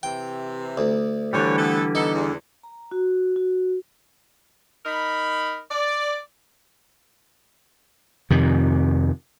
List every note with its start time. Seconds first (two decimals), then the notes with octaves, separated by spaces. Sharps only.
0.03 C3 E3 G5
0.78 D2
1.33 D3 E3 G3 G4 B4 C#5
1.57 A3 B3 A4
1.95 B3 D#4 A4
2.13 E2
2.63 A#5
2.92 F#4
3.36 F#4
4.86 D#4 A#4 B5
5.71 D5
8.30 F2 C3 D#3